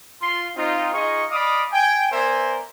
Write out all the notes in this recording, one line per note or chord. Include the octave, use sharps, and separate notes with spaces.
F4 C6
C4 D#4 F4
D#4 F4 G#4 D#5 F5 C#6
D5 D#5 F5 B5 D6 D#6
G5 G#5
B3 A#4 C5 D5 E5 G#5